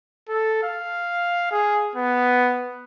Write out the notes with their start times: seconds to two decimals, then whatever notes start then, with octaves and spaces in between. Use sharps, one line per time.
0.29 A4
0.63 F5
1.51 G#4
1.96 B3